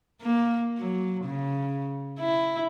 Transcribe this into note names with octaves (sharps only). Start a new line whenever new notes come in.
A#3
F#3
C#3
E4